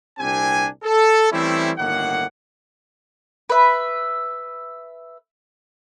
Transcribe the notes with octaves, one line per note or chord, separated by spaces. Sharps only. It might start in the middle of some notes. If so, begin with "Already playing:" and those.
C2 A#2 C4 D4 G4 G#5
A4
E3 G3 A3 C4 C#4 E4
G1 A2 D#3 A#3 F#5
B4 E5